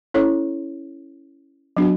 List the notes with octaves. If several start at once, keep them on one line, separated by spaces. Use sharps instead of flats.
C#4 E4 A4 C#5
F#3 B3 D4 F#4